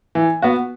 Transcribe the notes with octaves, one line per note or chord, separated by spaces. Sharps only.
E3
B3 F#4